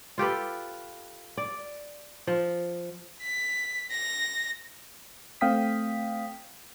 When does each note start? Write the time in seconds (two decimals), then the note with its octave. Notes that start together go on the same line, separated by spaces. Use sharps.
0.18 F4 G4 A4 B4
1.37 D5
2.27 F3
3.22 B6
3.91 A#6
5.41 A3 C4 F5 G5 D#6 B6